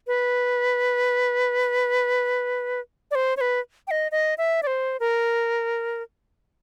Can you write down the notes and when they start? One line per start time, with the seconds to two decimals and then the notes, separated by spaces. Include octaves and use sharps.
0.07 B4
3.11 D5
3.15 C5
3.37 C#5
3.41 B4
3.87 G5
3.91 D#5
4.12 D#5
4.38 E5
4.63 D5
4.67 C5
5.00 A#4